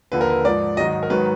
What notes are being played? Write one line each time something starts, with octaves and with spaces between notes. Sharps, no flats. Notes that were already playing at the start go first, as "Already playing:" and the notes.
D#2 D3 F3 B4
A#4
B4
G#2 F3 D5
G#2 D#3 F#3 D#5
A#4
G#2 D#3 F#3 B4